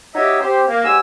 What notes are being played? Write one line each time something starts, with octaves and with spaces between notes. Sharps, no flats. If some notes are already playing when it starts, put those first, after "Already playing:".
D#4 F#4 G4 C#5 D#5 E5
C4 G4 C5
A#3
G#2 F#4 G4 G#5 E6